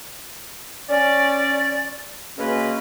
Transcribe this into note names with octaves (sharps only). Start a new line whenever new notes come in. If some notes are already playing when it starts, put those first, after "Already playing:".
C#4 D5
C#3 G#3 A#3 C#4 F#4 B4